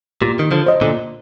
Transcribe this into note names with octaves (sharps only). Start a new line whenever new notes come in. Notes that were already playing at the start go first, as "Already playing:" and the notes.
A#2 G4
D#3
D3 F3
C5 D#5
A#2 D3